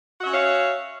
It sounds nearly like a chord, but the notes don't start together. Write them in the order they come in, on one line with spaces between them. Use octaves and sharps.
F#4 E5 C#4 C#5 F5